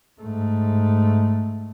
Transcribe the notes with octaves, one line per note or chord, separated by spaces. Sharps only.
G#2 A3